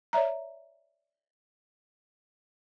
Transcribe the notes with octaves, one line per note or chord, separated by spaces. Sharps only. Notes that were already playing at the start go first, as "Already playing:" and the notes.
C#5 D5 E5 A#5